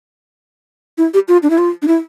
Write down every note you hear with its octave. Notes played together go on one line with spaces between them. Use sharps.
E4
G4
F4
D4
E4
F4
D4
E4